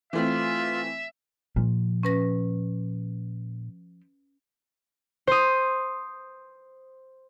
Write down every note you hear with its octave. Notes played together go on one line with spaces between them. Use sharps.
E3 A3 C4 F4 E5
A#2 F3
C#4 B4 A#6
C5 D#6